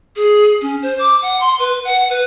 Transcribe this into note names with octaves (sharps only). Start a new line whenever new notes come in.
G#4
C#4
C5
D6
F#5
C6
B4
F#5
B4